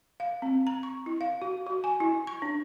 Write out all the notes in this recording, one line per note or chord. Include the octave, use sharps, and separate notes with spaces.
F5
C4
A#5
C#6
E4
F5
F#4
F#4
G#5
E4
C#6
D4